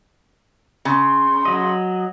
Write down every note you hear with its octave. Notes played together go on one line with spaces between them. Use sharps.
C#3 C6
F#3 D#5